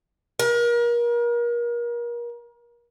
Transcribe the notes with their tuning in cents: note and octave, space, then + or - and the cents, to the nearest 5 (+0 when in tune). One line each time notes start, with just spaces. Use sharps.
A#4 +35